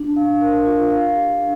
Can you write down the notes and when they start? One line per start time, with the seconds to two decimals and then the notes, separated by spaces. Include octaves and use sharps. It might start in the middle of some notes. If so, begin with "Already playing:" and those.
Already playing: D4
0.16 F5
0.41 A#4
0.66 F4
0.90 F5
1.16 G4
1.40 D4